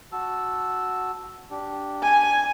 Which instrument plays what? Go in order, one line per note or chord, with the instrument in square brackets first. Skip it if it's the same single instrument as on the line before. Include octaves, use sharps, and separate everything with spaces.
[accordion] F#4 A5 E6
D4 G4
[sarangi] G#5